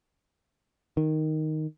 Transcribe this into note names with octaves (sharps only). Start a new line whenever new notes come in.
D#3